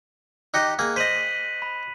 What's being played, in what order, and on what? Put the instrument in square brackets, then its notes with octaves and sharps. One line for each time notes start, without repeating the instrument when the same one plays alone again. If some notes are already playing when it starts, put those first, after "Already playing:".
[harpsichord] D#4 G4 D#5 [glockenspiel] F#6 C#7
[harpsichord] A#3 G#4
[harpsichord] C5 D#5 [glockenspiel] B6 D#7 F#7
[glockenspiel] B5